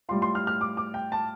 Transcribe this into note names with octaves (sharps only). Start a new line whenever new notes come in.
A2 G3 F4 C6
C6
F6
F6
D6
D6
G5
A5